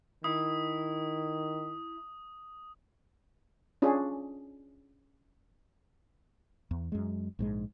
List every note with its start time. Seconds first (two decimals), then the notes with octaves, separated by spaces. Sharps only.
0.24 D#3 E4 D#6
3.82 C#4 D4 F4 G#4
6.71 E2
6.92 F#2 G#3
7.39 A#1 G#2 G#3